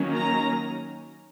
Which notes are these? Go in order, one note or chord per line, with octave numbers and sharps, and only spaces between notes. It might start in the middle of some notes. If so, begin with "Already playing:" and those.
Already playing: D#3 F#3 A#3 C#4
A#5